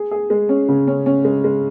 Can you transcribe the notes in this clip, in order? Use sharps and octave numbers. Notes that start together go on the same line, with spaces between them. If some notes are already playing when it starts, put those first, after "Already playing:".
Already playing: G#4
G#4
G#3
C#4
C#3
C#4
C#4
G#3
G#3